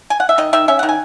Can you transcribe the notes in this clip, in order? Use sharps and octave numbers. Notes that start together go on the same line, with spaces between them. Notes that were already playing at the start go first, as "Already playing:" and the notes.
G#5
F#5
E5
D#3 D#5
D#3 E5
C#4 E5
D#3 F#5
G#5